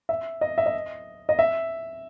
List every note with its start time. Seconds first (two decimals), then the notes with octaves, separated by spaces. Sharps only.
0.09 E5
0.41 D#5
0.58 E5
0.66 D#5
1.29 D#5
1.39 E5